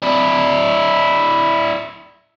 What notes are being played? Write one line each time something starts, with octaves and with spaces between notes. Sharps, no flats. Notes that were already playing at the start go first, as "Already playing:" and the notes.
D4 E4